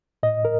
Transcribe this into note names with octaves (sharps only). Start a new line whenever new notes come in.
A2 D#5
A#4